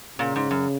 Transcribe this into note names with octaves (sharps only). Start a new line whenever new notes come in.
A#2 C#3
G#2
F#2